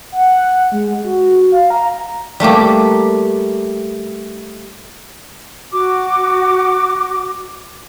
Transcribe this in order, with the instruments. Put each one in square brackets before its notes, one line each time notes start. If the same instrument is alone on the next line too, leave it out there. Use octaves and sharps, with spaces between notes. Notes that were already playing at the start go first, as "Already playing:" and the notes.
[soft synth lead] F#5
G#3
F#4
F5
A#5
[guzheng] G3 A3 A#3 G4
[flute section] F#4 D6